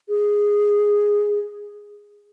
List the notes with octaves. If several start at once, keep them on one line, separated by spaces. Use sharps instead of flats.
G#4